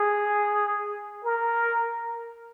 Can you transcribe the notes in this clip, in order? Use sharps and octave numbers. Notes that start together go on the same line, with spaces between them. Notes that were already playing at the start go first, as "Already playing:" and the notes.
Already playing: G#4
A#4